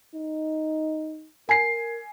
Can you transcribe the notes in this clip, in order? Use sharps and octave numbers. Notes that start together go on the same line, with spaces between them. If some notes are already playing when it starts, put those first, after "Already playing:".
D#4
A#4 G#5 C7